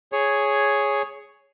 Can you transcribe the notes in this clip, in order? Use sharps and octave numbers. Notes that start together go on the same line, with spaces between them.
G#4 C#5